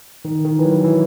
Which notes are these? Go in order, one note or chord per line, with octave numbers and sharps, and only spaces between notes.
D#3
D#3
E3
F#3
E3